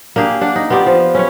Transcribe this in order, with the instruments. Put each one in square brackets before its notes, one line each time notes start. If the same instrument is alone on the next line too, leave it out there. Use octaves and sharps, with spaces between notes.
[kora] A#3 D4 G4 G#4
D4 D5 F#5
D#4
B3 F4 G4 D5
F3
C#4 B4 C#5